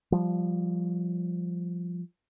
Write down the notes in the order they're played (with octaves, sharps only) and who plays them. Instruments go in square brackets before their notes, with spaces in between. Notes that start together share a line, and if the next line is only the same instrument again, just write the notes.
[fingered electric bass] F3 G3